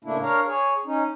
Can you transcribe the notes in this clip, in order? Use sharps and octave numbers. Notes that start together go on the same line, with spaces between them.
A2 C#3 A3 A#3 D4 E4
D4 A#4 C#5 F5 A#5
G#4 C#5
C#4 D#4